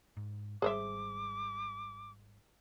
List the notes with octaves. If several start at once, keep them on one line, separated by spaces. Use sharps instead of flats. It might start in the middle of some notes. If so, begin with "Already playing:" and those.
G#2
G#1 G3 G#4 C5 E5 D6